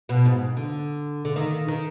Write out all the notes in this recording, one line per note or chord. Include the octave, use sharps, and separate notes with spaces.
B2
G#2
D3
D3
D#3
D#3